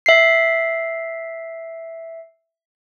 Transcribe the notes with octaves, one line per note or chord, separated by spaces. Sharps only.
E5 C7